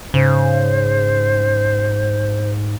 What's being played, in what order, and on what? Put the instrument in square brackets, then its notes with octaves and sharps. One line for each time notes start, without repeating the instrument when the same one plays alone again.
[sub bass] G#2 [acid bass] C#3 [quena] C5